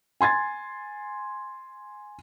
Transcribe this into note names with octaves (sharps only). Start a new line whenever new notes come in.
G#5 C6 G#6 A6